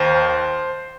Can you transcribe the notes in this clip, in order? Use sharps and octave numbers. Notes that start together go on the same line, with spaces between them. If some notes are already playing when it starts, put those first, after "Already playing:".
Already playing: D#2 D#3 C5